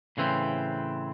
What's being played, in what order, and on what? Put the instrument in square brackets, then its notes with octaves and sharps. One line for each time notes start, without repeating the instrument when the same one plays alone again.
[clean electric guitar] A2 C#3 E3 C4